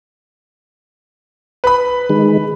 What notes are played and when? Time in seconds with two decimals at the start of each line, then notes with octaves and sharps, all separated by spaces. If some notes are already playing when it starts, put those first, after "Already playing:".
1.64 B4 B5
2.10 D#3 G#3